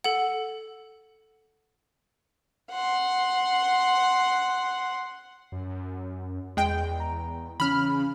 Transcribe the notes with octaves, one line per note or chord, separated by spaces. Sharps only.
A4 F#5
F#5 C6
F#2
E2 G#3 G5
A#5
C#3 E3 C#4 B5 F6